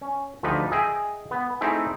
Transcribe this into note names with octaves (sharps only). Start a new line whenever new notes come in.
C#4
D2 F3 D#4 G4 B4
G#4 D#5 E5 G5
B3
A3 C4 D#4 E4 G#4 G5